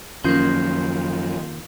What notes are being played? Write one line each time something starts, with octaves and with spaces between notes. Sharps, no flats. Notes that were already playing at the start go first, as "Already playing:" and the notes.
F#2 D#3 F3 A#3 C#4 F4 G6 C7